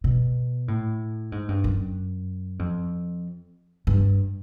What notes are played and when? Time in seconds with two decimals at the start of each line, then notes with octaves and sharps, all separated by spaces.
0.04 B2
0.68 A2
1.32 G#2
1.49 G2
1.64 F#2
2.59 F2
3.87 G2